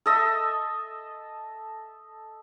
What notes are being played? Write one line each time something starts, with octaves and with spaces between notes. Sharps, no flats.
A4 D#5 E5